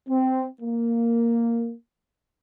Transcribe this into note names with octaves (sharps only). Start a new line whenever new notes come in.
C4
A#3